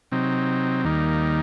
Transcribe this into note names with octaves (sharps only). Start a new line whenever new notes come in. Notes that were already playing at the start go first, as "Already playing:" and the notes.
C3 F#3 C4 D#4
D#2 D#3 G3 A#3 D#4